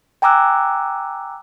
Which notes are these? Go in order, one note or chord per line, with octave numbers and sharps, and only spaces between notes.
G5 G#5 A#5 D6 E6 F#6